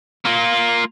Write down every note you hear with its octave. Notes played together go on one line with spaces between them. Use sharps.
A#3 F4